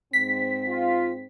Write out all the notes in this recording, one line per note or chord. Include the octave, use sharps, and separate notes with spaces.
G#2 C4 B6
F4